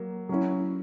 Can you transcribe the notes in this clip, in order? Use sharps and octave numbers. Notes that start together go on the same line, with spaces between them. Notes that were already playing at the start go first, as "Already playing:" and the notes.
Already playing: F#3 A#3
F#3 C#4 E4